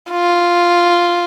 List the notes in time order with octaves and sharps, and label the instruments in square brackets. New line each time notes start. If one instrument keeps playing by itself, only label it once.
[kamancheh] F4